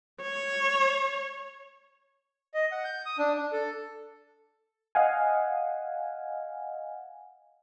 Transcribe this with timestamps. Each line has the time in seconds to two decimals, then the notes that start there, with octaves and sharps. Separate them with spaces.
0.22 C#5
2.54 D#5
2.71 F#5
2.84 G6
3.06 D#6
3.18 D4
3.36 D4
3.52 A4
4.95 D#5 F5 F#5 G#5